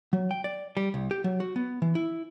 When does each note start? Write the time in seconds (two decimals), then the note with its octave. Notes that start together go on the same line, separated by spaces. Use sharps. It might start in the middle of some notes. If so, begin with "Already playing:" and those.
0.13 F#3
0.31 G5
0.44 D5
0.77 G3
0.94 C2
1.11 G4
1.24 F#3
1.40 F#4
1.56 B3
1.82 E3
1.95 E4